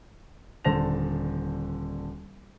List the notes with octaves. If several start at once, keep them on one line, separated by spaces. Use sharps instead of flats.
D#1 D3 C5 A5 A#6 F7